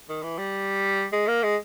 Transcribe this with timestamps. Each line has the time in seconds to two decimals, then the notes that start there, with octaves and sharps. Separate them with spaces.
0.09 D#3
0.23 E3
0.38 G3
1.12 G#3
1.28 A#3
1.43 G#3